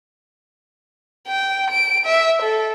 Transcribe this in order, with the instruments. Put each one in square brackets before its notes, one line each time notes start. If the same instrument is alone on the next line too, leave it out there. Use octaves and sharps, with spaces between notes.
[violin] G5
D7
E5
A4